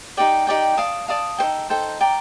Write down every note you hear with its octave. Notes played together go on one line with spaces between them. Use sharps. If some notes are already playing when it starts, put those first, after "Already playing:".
D#4 G4 D5 G5
D#4 G4 D5 G5
D5 F5 A5 D#6
D5 F5 A5 D#6
D#4 A4 C5 G5
D#4 A4 C5 G5
D5 G5 A#5